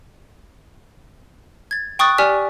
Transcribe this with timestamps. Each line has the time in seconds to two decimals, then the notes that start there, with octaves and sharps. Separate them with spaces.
1.71 G#6 A6
1.99 G5 C#6 D#6 F#6 A6
2.18 G4 D5 G#5 F6 B6